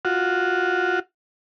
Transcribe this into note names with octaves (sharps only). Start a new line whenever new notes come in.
F4 F#4